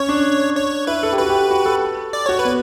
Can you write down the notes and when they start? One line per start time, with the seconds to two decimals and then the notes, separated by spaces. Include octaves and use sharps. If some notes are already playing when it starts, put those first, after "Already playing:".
Already playing: C#4 C#5
0.09 D4
0.57 C#5
0.87 E4 B4
1.03 A4
1.12 G4
1.18 F#4 B4
1.29 G4
1.51 F#4
1.66 A4
2.13 D5
2.26 F#4 C#5
2.39 B4
2.45 B3